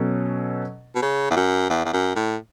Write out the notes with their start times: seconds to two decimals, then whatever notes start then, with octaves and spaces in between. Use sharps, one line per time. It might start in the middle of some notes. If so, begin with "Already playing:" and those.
Already playing: B2 F#3 C#4 A4
0.95 B2
1.02 C#3
1.31 E2
1.37 F#2
1.70 E2
1.85 E2
1.93 F#2
2.16 A2